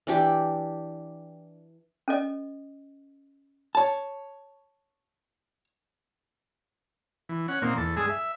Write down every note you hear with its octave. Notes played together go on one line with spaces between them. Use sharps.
E3 D4 G4
C#4 A4 D#5
C#5 A5
E3
C#4 F#5
A#2 D#3 A#3 C4
E2 A4
G2 G#3 G#4 E6
E5